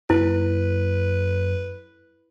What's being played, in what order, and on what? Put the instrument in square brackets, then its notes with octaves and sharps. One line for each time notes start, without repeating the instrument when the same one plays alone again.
[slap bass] F#2 A#3 [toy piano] E4 [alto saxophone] B4